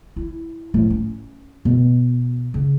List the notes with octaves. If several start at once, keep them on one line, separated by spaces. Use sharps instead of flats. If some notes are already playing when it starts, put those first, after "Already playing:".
E4
A2 F3
C#4
B2
C#3